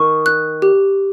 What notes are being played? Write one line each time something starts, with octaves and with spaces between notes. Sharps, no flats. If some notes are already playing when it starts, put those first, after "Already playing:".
Already playing: D#3 C#6
F#6
G4